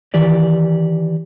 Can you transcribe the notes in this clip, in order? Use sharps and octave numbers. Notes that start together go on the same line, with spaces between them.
D#3 E3 G4 D5